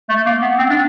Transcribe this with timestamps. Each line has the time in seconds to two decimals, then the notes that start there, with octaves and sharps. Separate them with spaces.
0.09 A3
0.26 A#3
0.42 B3
0.58 C4
0.70 D4